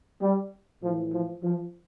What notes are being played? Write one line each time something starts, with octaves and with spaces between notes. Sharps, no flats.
G3
A2 E3 F3
F3
F3